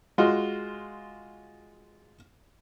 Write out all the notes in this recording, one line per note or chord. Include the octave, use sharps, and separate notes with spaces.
G#3 F4 F#4 D#5